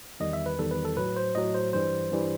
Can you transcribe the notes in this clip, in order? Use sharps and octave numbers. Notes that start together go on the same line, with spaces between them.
E2 D#3 G3 D#5
E5
B4
E2 D#3 G3 A4
B4
A4
A2 F#3 B4
C5
A2 F#3 D#5
C5
G2 E3 G3 C5
G2 E3 G3